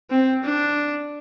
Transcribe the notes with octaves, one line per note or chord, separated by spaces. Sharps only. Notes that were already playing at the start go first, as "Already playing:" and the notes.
C4
D4